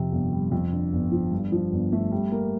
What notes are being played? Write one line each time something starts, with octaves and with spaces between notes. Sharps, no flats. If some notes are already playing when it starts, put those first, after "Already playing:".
Already playing: F2 C3
G1
G3
F2
D3
G1
F3
G2
F3
G1
A3
G3
A#3